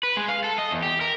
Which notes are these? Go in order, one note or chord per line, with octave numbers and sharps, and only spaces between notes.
B4
G#3
F5
A4
D#5
E2
G4
A#4